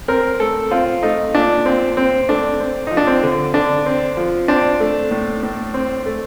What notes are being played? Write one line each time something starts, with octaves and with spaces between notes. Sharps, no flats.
C4 A#4
A3 A4
C4 F4
A3 D#4
A#2 D4
A#2 C4
C4
A3 D4
C4
F3 D#4
D4
C4
D3
D3 D4
C4
F3
C4 D4
A3
A2
A2
C4
A3